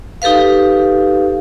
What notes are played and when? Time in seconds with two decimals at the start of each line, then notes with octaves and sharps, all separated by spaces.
0.22 D#4 G4 A4 B4 F5